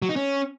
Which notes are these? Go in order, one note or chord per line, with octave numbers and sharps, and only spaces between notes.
F#3
D#4
C#4